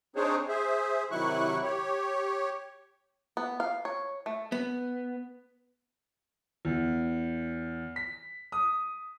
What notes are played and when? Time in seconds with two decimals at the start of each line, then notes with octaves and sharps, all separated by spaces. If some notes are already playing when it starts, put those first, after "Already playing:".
0.16 C4 D4 D#4 G#4 C5 C#5
0.48 G#4 C5 E5
1.11 C3 D#3 F#3 E4 C#6 F#6
1.63 G4 C#5
3.37 B3
3.60 F5
3.85 C#5
4.26 A3
4.52 B3
6.65 E2
7.96 B6
8.52 D#6